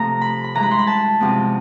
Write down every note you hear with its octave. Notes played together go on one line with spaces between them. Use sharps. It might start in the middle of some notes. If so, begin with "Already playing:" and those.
Already playing: C3 F3 A3 A#5
B5
B5
G2 E3 G#3 A#5
B5
C6
B5
A5
E2 C3 F3 G#3 C4